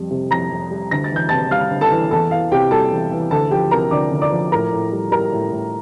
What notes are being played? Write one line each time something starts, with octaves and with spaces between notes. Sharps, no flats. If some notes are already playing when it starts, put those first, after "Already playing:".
Already playing: F2 G3
C3
F2 A#5 A#6
F2
G3
D2 A#6
A6
E3 G6
C3 A5 A6
G3 F5 F6
D2
A4 A5
E3
E2 A4 A5
E3 F5
C3 G4 G5
G3 A4 A5
E2
E3
D2 A4 A5
F3 G4 G5
C3 A#4 A#5
D2 D5 D6
D2
D5 D6
F3
A2 A#4 A#5
A2
G3
G3 A#4 A#5
A2
A2